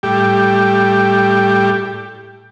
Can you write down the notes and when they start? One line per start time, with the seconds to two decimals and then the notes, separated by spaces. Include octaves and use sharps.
0.03 A2 G3 G4